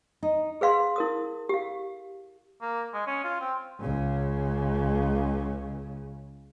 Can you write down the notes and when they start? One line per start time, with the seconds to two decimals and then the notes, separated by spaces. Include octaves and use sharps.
0.23 D#4
0.61 G#4 B4 F5 C6
0.96 E4 A#4 D#6
1.49 G4 F5
2.61 A#3
2.94 G#3
3.07 C#4
3.24 F4
3.40 C4
3.80 C#2 C#3